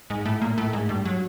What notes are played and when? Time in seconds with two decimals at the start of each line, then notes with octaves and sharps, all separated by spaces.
0.10 G#2 G#3
0.25 A2 A3
0.42 A#2 A#3
0.58 A2 A3
0.73 G#2 G#3
0.89 G2 G3
1.06 F#3